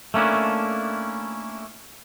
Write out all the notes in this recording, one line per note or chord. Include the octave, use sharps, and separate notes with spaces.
A3 A#3 C#4 D4 E4